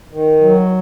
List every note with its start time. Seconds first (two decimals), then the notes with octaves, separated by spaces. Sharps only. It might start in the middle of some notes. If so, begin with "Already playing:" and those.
0.12 D#3
0.41 F#3